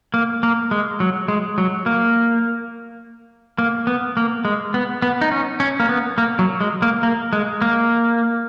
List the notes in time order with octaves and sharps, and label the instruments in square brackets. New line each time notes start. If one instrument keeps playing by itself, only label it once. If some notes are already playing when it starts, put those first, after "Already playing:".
[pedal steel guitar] A#3
A#3
G#3
F#3
G#3
F#3
A#3
A#3
B3
A#3
G#3
B3
B3
D#4
C#4
C#4
A#3
B3
A#3
F#3
G#3
A#3
A#3
G#3
A#3